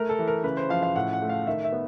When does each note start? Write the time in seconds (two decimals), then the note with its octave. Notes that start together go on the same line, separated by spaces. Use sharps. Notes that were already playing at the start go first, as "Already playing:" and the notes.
Already playing: A3 A#4
0.09 A4
0.19 E3
0.27 A#4
0.44 C#3 B4
0.57 C5
0.69 F3 F5
0.83 F5
0.95 A2 F#5
1.13 F#5
1.22 A3
1.29 F5
1.47 D#3 E5
1.64 E5
1.72 B3